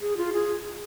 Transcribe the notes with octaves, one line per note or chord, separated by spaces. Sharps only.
G#4
F4
G#4